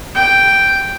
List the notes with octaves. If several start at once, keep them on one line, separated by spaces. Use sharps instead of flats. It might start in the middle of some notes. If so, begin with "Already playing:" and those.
G5